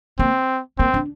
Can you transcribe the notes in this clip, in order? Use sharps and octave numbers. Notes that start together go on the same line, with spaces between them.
A#3 C4
A#3 C4
D4